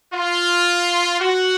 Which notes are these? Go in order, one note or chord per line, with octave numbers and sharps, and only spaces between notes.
F4
F#4